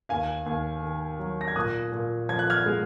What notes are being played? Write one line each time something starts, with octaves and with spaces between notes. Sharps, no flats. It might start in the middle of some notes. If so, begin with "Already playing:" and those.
D#2 F5 G#5
D#2
D#3
F#3
A#6
G#6
A#2 D#6 F#6
A#2
F3 G#6
F#6
F6 G#6
G#3